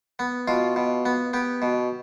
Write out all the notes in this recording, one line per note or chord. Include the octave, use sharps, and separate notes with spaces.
B3
B2 F4
B2
B3
B3 G4
B2